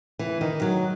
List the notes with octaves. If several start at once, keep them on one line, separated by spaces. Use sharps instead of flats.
E3
D#3
F#3